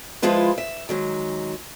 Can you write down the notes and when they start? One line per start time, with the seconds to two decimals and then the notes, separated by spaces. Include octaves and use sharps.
0.22 F3 G#3 E4 F4 B4
0.58 E5
0.89 D#3 F#3 G#3